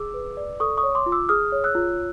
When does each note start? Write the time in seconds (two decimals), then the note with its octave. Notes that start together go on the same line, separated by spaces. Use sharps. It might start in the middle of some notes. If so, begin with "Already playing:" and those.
Already playing: G#4 D6 E6
0.14 B4
0.37 D5
0.60 A4 C#6 D#6
0.77 C#6 D#6
0.83 C#5
0.95 C6 D6
1.06 F4
1.12 D6 E6
1.29 G#4 D#6 F6
1.52 C#5
1.64 E6 F#6
1.75 F4